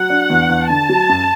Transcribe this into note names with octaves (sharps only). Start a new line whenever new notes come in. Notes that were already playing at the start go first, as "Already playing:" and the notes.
Already playing: F#3 F#5
D4
E2
E2
D3 A5
F#3
F#2